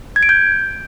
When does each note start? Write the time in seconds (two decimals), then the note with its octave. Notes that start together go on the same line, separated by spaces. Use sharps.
0.16 G#6
0.23 D7
0.29 G6